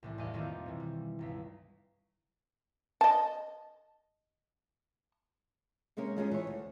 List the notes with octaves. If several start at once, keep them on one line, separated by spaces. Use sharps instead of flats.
C2 A2 E3
A1 E2 D5 D#5 F5
C2 F2 D#3 A#3 C4 F4
B2 E3
G3
G1 C#2 B6
D#5 A5
C3 G#3 A#3 C#4 A#4
F3 G3 G#3 C#4 D#4 G#4
E3 C#5
D2